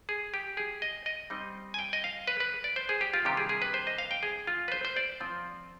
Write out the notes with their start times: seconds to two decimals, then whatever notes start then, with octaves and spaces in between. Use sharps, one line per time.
0.09 G#4
0.34 G4
0.57 G#4
0.82 D#5
1.06 D#5
1.30 G3 C4 D#4
1.74 G#5
1.79 G5
1.93 D#5
2.04 F5
2.27 B4
2.40 B4
2.64 D5
2.76 C5
2.89 G#4
3.01 G4
3.14 F4
3.25 C3 D#3 G3 D4 G4
3.37 G#4
3.49 G#4
3.62 B4
3.74 C5
3.87 D#5
3.98 F5
4.11 G5
4.23 G#4
4.47 F4
4.68 B4
4.72 C5
4.85 C5
4.97 D5
5.20 F3 C4 F4